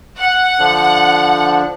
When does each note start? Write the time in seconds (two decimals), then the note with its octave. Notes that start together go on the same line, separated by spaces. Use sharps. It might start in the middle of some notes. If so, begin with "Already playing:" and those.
0.18 F#5
0.59 D3 F3 D4